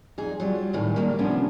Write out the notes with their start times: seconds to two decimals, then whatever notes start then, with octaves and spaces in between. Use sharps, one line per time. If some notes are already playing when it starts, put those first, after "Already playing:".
0.18 F2 D#4 G#4
0.40 F#3 G3 F4
0.73 A2 D#3 C4 C#4 G#4
0.96 D#3 G3 A#3
1.19 D#2 C3 F3 B3 C#4 D4